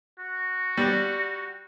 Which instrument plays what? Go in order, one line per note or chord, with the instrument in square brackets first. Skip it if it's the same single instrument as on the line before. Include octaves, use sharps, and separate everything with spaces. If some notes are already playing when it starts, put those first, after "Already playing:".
[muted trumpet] F#4
[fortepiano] G3